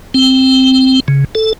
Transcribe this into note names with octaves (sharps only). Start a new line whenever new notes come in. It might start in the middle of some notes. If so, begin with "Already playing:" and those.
C4
C#3
A4